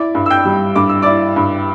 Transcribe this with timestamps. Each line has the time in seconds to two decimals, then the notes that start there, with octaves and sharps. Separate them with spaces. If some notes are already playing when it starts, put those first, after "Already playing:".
Already playing: E4 D5 D6
0.15 G2
0.26 E6
0.30 G5 G6
0.45 G3
0.76 G2 D6
0.89 E6
1.02 D5 D6
1.06 E4
1.36 G2